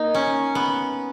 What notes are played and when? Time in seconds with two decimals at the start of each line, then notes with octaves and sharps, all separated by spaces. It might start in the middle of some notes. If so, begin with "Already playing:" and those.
Already playing: A#3 D#4
0.15 C#4
0.55 B3